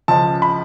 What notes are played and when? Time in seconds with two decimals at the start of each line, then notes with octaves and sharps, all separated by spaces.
0.08 C#2 C#3 F3 A5
0.42 B5